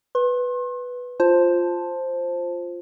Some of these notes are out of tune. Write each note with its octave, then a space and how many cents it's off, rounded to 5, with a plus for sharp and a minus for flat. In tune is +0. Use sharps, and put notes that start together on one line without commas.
B4 +0 C6 +40
F4 +0 C5 +5 A5 +0